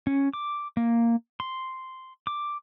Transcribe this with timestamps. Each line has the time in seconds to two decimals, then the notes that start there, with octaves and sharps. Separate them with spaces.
0.07 C#4
0.33 D6
0.77 A#3
1.40 C6
2.27 D6